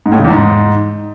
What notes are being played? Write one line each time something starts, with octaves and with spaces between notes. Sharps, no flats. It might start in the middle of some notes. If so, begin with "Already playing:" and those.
G#2
A2
C#3
E2
G#2